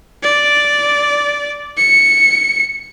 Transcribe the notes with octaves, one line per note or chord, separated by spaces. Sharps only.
D5
C#7